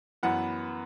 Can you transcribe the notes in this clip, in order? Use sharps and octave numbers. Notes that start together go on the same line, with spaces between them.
F#2 E3 B3 F#5